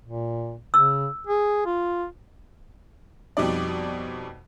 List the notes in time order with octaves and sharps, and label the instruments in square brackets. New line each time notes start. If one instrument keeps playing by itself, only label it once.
[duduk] A#2
[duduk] C#3 [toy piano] E6
[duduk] G#4
F4
[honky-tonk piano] F2 B2 G3 D#4 D5